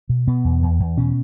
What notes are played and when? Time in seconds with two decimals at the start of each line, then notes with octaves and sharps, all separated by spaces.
0.09 B2
0.27 B2 B3
0.44 E2
0.62 E2
0.80 E2
0.97 B2 C#4